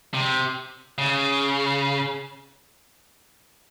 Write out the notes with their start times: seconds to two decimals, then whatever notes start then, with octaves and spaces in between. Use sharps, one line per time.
0.14 C3
0.98 C#3